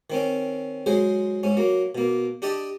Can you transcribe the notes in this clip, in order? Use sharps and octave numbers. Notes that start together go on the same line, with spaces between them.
D#3 C4 C#4
F#3 G#3 G#4 C5
G#2 C#4
F#3 A#3
B2 A#3
D4 G4 D#5 A5